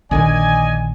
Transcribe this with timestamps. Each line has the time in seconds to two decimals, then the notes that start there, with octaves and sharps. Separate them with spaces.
0.11 A#1 D3 D#3 D5 D#5 G#5